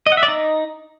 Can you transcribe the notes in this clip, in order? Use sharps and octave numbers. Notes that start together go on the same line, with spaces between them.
D#5
F#5
E5
D5
D#4